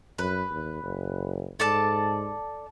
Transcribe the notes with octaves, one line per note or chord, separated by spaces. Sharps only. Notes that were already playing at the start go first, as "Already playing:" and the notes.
F#2 B4
D#2
F#1
G#2 A4 D5 A5